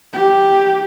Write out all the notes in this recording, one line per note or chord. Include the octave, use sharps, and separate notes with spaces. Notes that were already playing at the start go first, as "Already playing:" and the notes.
G4